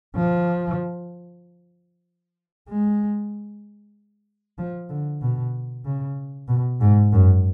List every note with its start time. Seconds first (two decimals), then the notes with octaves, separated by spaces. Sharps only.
0.15 F3
2.68 G#3
4.58 F3
4.89 D3
5.21 B2
5.85 C#3
6.48 B2
6.81 G#2
7.12 F#2